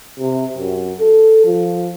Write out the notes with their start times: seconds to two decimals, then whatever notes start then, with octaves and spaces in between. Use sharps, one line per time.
0.19 C3
0.58 F#2
1.00 A4
1.45 F3